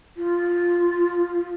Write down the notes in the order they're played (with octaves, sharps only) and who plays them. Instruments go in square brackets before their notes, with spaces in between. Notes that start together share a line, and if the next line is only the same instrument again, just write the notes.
[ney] F4